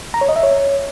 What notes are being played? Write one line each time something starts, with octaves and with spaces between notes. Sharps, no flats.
A#5
C#5
D#5
E5
C#5